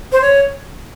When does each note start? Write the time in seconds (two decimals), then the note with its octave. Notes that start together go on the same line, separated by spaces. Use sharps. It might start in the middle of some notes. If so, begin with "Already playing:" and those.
0.12 C5
0.22 C#5